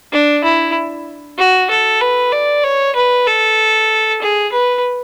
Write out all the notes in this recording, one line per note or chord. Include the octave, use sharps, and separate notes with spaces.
D4
E4
F#4
A4
B4
D5
C#5
B4
A4
G#4
B4